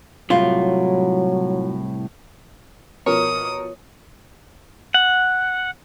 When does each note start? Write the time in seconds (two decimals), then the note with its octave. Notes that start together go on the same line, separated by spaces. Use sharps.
0.30 C2 A2 F#3 F4
3.06 B2 F3 A#4 C#5 D#6
4.94 F#5